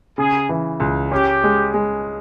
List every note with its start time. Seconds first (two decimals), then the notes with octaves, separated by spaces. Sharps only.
0.18 C#3 G#4
0.49 E3
0.80 C#2
1.12 C#4 G4
1.44 G#3
1.74 G#3